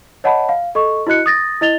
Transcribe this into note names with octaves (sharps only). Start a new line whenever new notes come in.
C#5 D#5 F#5 A5 B5
F5
A4 D#5 C#6
E4 F#4 D#5 F#6 C#7
D#6 A6 A#6
E4 D#5 A6 F7 G7